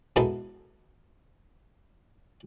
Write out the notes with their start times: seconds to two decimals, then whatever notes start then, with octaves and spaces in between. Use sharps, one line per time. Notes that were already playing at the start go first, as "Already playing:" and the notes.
0.16 B2 G#3 B3 D#4 E4 A4